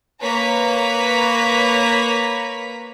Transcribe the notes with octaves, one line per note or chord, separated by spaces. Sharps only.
A#3 B4 C#5 A#5 B6